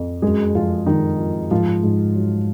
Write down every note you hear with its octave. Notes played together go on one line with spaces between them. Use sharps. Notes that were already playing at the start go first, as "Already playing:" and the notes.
Already playing: F2
F#2 G#3 G#4
F#2 F3 F4
D#3 G#3 D#4
F3
G#2 F3 F4
G#2
F#3